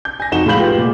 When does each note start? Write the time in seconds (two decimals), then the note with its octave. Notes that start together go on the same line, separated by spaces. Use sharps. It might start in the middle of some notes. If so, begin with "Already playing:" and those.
0.05 G6
0.20 G#5 A#6
0.32 F2 D#4 F#4 E7 G7
0.46 A2 G#3 F5 B5 G6 F#7
0.58 F4 G4 B4
0.78 A#2 G#3